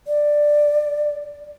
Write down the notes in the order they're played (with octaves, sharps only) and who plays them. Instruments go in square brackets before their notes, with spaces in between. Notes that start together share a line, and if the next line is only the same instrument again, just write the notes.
[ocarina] D5